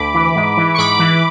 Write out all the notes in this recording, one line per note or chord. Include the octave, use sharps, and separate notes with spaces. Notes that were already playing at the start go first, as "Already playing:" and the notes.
Already playing: D2 B5 D6
E3
G#2
E3
C#6
G#2 B5 D6
E3